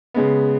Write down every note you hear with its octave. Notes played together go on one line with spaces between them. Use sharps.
C#3 G#3 B3